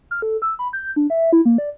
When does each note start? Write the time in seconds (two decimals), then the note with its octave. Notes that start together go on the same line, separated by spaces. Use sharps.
0.11 F6
0.22 A4
0.42 E6
0.59 B5
0.73 G6
0.96 D4
1.10 E5
1.32 E4
1.45 A#3
1.58 D5